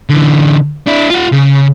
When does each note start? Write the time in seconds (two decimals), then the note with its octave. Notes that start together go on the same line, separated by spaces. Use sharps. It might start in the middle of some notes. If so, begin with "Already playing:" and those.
0.10 D3 E3
0.87 D4 E4
1.11 F4 F#5
1.33 C#3